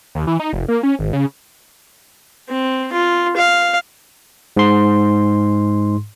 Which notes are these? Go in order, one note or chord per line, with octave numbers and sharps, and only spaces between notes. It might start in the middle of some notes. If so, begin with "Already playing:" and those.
D#2
E3
D#4
F1
A#3
C#4
G#1
C#3
C4
F4
F5
G#2 C6